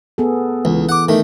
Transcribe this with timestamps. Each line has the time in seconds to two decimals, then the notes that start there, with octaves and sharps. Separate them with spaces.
0.18 B3 G#4 A4
0.65 C#2 E3
0.89 F#5 D6
1.08 D#3 A3